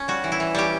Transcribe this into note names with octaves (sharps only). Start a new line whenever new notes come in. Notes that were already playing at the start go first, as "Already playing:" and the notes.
Already playing: C#4
G3 F#4
E3
E4
E3
G3 C#4 G4